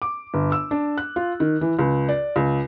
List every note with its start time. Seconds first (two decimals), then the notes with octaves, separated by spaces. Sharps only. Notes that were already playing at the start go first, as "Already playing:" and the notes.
0.02 D6
0.34 G1
0.52 E6
0.71 D4
0.98 F#6
1.16 F4
1.40 D#3
1.61 E3
1.79 C#2
2.09 D5
2.36 C#2